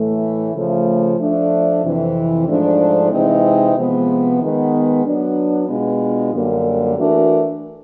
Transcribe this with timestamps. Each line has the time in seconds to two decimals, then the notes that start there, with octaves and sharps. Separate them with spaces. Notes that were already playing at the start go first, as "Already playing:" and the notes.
Already playing: A2 E3 A3
0.54 C#3 F3 A3
1.18 F3 A3 D4
1.83 F2 C3 E3
2.47 G#2 F3 A3 D4
3.11 C3 E3 G#3 C4 D#4
3.76 C3 F3 G#3 B3
4.39 D#3 G#3 B3
5.04 F#3 B3 D4
5.68 B2 G#3 B3 D4 F4
6.33 F#2 D3 G3 A#3
6.97 E3 A3 D4 F#4 A#4